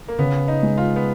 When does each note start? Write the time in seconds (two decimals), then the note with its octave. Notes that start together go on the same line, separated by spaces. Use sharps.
0.08 A#3
0.19 C#3 B3
0.48 D#4
0.63 G#3
0.78 F4
0.96 B3